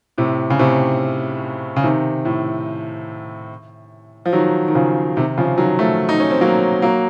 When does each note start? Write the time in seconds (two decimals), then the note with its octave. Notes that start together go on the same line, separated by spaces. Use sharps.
0.18 A2 C3
0.50 C#3
0.59 A2 C3
1.76 C#3
1.84 C3 D#3
2.25 A2
4.26 F3
4.33 D#3 F#3
4.68 D#3
4.75 C#3 F3
5.16 C3 D#3
5.38 C#3 F3
5.58 D#3 F#3
5.79 F3 A3
6.09 D#4
6.20 C#4
6.30 C4
6.41 F#3 A#3
6.82 F#3 A#3